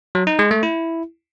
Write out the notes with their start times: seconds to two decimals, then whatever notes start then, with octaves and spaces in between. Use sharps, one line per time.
0.15 F#3
0.27 D#4
0.39 G#3
0.51 A3
0.63 E4